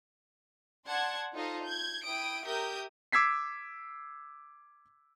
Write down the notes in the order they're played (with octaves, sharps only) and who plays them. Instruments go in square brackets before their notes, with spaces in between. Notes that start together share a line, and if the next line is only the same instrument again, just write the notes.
[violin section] D5 F#5 A5 C6 G#6
D#4 F4 A4 C5 D#5
G6 G#6
E4 G5 D#6 D7
G4 A#4 E5 D#6 G6
[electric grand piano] D6 E6 G#6 B6 C7